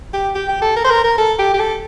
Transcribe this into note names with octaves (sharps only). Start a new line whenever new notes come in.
G4
G4
G4
A4
A#4
C5
A#4
A#4
A4
G4
G4
A4